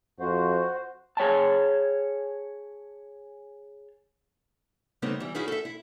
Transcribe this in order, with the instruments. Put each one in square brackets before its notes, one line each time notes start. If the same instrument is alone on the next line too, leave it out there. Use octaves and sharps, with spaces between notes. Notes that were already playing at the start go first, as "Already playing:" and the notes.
[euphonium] F2 [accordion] F#4 C5
[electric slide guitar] G#4 C#5 G5 A5
[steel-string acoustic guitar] C#3 G3 A3 B3 C4 D#4
E3 G3
C#4 D#4 E4 F#4 G#4 B4
A4 E5
E4